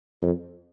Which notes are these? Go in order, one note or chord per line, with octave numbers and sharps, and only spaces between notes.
F2